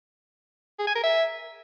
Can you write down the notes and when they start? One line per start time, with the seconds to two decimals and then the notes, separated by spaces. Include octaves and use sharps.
0.79 G#4
0.87 G#5
0.95 A#4
1.04 E5